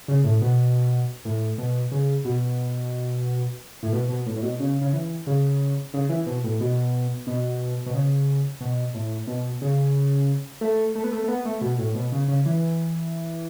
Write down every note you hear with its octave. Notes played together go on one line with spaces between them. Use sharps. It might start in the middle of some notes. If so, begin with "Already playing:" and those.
C#3
A2
B2
A2
B2
C#3
B2
A2
B2
B2
A2
A2
B2
C#3
C#3
E3
C#3
C#3
E3
B2
A2
B2
B2
B2
C#3
B2
A2
B2
C#3
A3
A3
B3
A3
A3
B3
A3
B2
A2
B2
C#3
C#3
E3